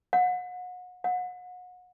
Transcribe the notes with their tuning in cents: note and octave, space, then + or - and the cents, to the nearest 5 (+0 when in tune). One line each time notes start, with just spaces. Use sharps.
F#5 -35
F#5 -35